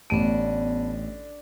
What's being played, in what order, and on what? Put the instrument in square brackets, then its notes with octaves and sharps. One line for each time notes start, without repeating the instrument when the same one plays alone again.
[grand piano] A1 D#7 [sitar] D3 [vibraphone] A3 B3